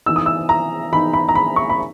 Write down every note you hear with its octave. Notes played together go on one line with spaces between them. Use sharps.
E3 B3 D#4 E6
D#6
E6
A#5
E3 B3 D#4 B5
B5
A#5
B5
C#6
B5